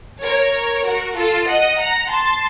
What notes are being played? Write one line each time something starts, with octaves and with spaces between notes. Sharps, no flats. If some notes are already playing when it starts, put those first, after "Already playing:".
A#4 C#5
F#4 A#4
F4 A4
D#5 F#5
F#5 A#5
A5 C6